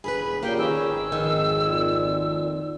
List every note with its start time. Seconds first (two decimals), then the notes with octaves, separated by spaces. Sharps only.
0.04 E1 G#4 A4 B4 B5
0.43 A#2 C#3 A#3 G4 G5
0.59 D#3 C#4 G#4 B4 E6
0.90 G#1 G#4
1.12 F2 D#3
1.64 A#2